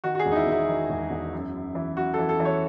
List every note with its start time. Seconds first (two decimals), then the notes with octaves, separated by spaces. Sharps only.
0.04 D#3 F#4
0.15 F#4
0.19 G#4
0.26 E1
0.32 D#4
0.36 E4
0.47 E1 E4
0.69 D#3
0.90 E1
1.11 E1
1.33 F#2
1.55 F#2
1.75 E3
1.97 F#2 F#4
2.14 E3 A4
2.29 A4
2.40 E3
2.45 C#5